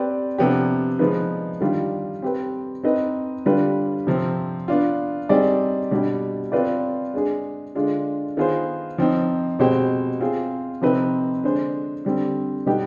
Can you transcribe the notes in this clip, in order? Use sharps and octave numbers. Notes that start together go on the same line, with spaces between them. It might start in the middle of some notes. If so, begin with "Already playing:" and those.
Already playing: C4 G4 B4 D5
C3 F3 B3 D4 G4
F3 G#3 B3 D#4 B4
D#3 G3 D4 F4
C4 G4 B4
C4 D#4 B4 D#5
D3 G3 D4 F4 B4
C3 F3 C4
B3 D4 F4
G3 C4 D#4 G#4 D5
B2 G3 D4 G4
C4 F4 B4 D5
G#3 D4 G#4
D3 G#3 D4 F4
D#3 B3 F4 G#4 C5
F3 C4 D#4
B2 G#3 C4 G4 C5
C4 F4 G#4
C3 F3 C4 D#4 B4
D3 G#3 D4 G#4 C5
D3 G3 C4
B2 G3 B3 D#4 G4